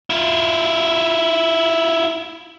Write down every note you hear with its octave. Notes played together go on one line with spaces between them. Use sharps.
E4 F4